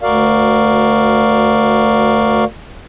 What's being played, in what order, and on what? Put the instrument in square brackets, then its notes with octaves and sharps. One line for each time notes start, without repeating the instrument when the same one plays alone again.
[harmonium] D2 F#4 A#4 D5 F5